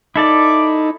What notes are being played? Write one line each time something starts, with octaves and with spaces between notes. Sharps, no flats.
D#4 E4 A4 D5 D6